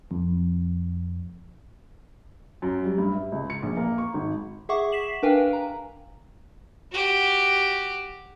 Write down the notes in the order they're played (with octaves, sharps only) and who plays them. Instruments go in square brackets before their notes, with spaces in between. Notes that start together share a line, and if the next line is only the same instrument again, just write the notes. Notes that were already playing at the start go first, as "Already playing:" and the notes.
[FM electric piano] F2
[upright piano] F#2
G3
G2
E5
C#2
C#7
A#1
A#3
C#6
G#1
[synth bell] G#4 E5 F#5 C#6 D6
B6 C7 E7 F#7
D4 A#4 B4 F5 G5 G#5
A#5
[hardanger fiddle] F#4 G4